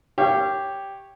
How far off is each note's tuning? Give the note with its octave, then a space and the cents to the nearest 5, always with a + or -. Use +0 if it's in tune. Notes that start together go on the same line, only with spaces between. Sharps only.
G4 +0 C#5 -10 F5 -35